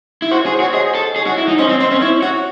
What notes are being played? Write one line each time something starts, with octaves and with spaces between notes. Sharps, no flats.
E4
F#4 C5
C#5
G#4
C5
F#4
C#5
G#4 C5 D#5
A4
G#4 C#5
F#4
E4
D#4
C#4 C5 D#5
C4
C4 C5
C#4 C5
E4 C#5
F#4 C#5